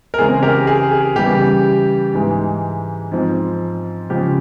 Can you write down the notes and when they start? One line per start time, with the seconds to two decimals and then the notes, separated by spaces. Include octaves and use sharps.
0.14 A#4
0.18 C#3 E3 G#3 C4 G#4
0.43 G4 A#4
0.67 G#4
0.91 G#4
1.16 C#3 E3 G3 G4
2.14 G#2 E3 G#3
3.12 G#2 F3 C4
4.10 C#3 F3 G#3 G4